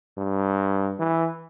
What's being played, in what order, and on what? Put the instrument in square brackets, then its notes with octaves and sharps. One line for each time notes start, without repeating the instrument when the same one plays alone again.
[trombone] G2
E3